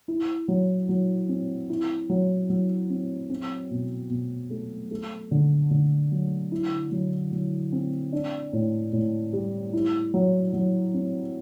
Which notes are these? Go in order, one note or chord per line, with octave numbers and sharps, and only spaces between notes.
E4
F#3
F#3
C4
E4
F#3
F#3
C4
C4
B2
B2
A3
A3
D3
D3
F#3
E4
F#3
F#3
C4
D4
A2
A2
G3
E4
F#3
F#3
C4